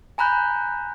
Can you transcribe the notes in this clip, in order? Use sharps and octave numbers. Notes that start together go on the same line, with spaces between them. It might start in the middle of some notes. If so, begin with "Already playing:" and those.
G#5 A#5 B5 F#6 G6